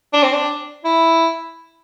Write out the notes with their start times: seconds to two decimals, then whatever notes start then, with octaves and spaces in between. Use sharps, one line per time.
0.14 D4
0.23 C4
0.33 D4
0.85 E4